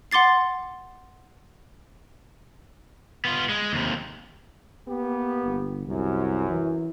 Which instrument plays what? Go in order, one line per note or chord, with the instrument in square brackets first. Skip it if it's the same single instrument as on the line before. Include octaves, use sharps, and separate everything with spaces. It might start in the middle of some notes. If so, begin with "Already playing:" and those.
[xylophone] F#5 C6 D6 A6 C7
[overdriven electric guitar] B3 F4
G#3
D#2 C3
[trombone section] A#3 B3 G4
[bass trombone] G1
[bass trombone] C2 [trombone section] F#2
[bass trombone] E3